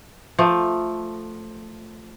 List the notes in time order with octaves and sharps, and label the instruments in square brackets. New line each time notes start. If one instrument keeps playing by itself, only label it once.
[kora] F3 A3